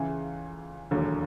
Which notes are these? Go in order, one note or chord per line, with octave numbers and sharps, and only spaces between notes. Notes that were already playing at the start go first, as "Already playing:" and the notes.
Already playing: C#2 C#3 E3
E1 D#2 D3 F#3